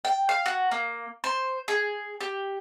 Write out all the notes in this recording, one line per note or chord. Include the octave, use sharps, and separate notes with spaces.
G5
F5
F#4
A#3
C5
G#4
G4